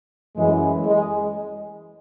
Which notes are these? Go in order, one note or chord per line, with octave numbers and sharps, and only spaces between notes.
F#2 E3 G#3
G#3